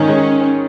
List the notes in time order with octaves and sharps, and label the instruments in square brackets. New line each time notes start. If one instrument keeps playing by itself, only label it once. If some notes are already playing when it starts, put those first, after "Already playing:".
Already playing: [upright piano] G#2 D#3 D#4 [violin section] C#4
[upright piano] G#3